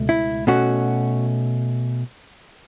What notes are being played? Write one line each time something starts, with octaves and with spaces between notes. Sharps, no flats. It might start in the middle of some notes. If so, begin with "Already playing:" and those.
Already playing: C#2 B2 A3
E4
B2 A3 C#4 F#4